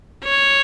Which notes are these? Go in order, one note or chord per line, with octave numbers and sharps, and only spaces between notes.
C#5